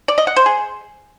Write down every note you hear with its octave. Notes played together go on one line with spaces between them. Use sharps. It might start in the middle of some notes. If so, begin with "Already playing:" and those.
D5
D#5
F#5
C5
G#4